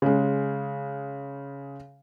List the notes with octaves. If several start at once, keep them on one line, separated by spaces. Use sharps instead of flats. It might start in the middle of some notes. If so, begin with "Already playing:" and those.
C#3 G#3